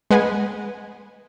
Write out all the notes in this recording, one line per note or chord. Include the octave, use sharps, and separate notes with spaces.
G#3 B4 F#5 G#5